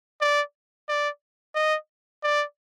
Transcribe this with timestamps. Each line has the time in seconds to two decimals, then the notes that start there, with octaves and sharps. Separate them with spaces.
0.21 D5
0.89 D5
1.55 D#5
2.23 D5